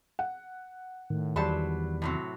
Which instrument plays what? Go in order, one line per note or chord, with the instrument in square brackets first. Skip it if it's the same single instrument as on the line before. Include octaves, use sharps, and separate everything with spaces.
[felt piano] F#5
[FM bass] A2 [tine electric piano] D#3
[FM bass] E2 [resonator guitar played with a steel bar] F#3 C5 A5 [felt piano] G3 D5 B5
[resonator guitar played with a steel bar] A2 C3 F#3